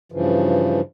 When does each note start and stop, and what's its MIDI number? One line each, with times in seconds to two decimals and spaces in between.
0.12 0.81 43
0.12 0.81 49
0.12 0.81 52
0.12 0.81 53